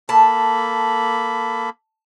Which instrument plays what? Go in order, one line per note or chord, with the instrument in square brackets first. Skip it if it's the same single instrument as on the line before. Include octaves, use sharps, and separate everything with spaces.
[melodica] A#3 A4 B5 [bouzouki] A5